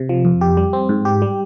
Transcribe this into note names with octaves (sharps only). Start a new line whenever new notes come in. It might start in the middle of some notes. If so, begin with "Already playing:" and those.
Already playing: C3
F3
F2
G4
G3
C4
G#2
G4
G3